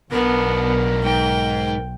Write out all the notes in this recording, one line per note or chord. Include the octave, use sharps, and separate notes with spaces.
B1 B2 B3 D4 A#4
G#2 G5